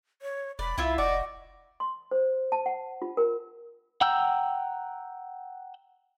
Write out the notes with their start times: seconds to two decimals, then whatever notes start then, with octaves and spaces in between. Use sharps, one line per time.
0.22 C#5
0.59 E1 D5 B5
0.78 C2 E4 F4 E5
0.98 F1 F#4 D5 D#5
1.80 C6
2.11 C5
2.52 A5
2.66 F#5
3.02 F4
3.17 A#4
4.01 F#5 G5 A#5 E6 G6